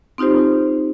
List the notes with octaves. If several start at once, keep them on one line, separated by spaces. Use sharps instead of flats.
C4 D#4 F4 G4 C5